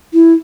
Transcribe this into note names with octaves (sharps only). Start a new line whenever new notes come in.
E4